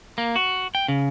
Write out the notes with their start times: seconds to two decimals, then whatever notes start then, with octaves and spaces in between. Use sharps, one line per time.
0.18 A#3
0.36 F#4
0.75 G5
0.88 C#3